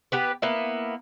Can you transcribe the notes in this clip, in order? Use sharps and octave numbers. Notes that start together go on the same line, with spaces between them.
B3 G4 B4
A#3 B3 E4